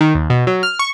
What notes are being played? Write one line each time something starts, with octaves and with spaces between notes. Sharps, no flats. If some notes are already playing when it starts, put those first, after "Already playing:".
D#3
D#2
B2
F#3
F6
C#6